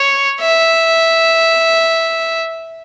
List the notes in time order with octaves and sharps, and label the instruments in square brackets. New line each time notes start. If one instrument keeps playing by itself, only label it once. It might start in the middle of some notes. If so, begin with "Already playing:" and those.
Already playing: [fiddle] C#5
E5